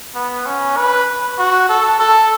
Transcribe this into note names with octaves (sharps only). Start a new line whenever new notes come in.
B3
C#4
B4
F#4
A4
A4